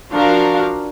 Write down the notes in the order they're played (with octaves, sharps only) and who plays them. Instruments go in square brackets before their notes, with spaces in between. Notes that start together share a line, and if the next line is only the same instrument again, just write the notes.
[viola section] F3 D4 F#4 A#4 F5